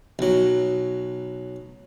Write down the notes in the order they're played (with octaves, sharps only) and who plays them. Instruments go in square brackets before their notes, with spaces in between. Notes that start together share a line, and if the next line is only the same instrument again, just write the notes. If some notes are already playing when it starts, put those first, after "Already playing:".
[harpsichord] B1 F#3